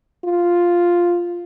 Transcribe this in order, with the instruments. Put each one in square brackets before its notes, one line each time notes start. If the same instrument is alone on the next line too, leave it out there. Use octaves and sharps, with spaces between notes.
[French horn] F4